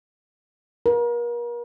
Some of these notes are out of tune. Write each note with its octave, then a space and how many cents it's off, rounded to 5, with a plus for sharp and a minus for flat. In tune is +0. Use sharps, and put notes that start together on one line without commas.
A#4 +40